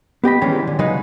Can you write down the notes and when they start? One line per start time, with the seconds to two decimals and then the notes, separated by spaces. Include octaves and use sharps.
0.24 B3 G4 D#5 B5
0.41 D#3 E3 G3 G#3 B3 C#4
0.67 D3
0.79 C#3 F#3 G#3 D#4 G#4 B4